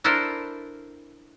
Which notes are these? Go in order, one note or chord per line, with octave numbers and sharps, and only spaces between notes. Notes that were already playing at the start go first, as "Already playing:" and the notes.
D4 E4 A4 A#4 C5